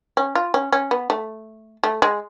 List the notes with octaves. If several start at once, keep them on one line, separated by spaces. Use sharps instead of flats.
C#4
F4
C#4
C#4
B3
A3
A3
G#3